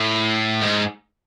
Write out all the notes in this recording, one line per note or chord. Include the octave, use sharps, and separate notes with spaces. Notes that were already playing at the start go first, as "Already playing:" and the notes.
Already playing: A2
G#2